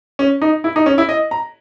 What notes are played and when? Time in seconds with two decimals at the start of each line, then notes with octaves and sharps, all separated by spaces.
0.19 C#4
0.42 D#4
0.64 E4
0.76 D#4
0.86 C#4
0.98 E4
1.09 D#5
1.31 A#5